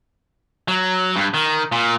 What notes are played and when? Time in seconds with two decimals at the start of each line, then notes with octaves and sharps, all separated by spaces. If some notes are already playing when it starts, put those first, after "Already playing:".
0.68 F#3
1.16 G2
1.34 D#3
1.72 A#2